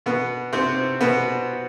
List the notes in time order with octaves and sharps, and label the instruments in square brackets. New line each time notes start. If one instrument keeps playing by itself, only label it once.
[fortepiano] B2 B3
C3 C4
B2 B3